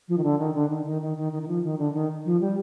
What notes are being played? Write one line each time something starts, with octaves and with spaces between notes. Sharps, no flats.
F3
D#3
D3
D#3
D3
D#3
D#3
D#3
D#3
D#3
D#3
F3
D#3
D3
D#3
F3
G3